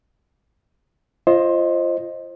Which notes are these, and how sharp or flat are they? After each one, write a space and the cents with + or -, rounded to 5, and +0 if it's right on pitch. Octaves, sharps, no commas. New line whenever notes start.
F4 -20 C5 +20 D#5 +0